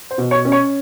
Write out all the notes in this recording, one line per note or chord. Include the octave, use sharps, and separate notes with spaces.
C5
B2
C#5
C#4
C#5